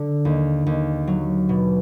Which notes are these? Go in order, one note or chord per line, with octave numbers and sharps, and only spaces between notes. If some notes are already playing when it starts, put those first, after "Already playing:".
Already playing: D3
D#2
D#2
F#3
B2